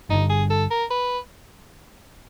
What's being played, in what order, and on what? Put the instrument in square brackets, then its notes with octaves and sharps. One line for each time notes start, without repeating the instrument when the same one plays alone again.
[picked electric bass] G1 G2 D3 [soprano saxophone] D#4
[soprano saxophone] G#4
A4
A#4
B4